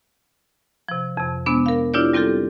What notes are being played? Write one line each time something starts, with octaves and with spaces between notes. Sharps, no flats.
C3 F3
F2 C3
C3 G#3 B3 D4
A#4 F5
D4 E4 F4 G4 C#5 D5
G3 C4 F4 G4 A4